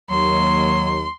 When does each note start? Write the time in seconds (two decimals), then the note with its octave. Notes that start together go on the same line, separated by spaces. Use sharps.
0.10 D#2 F#3 C6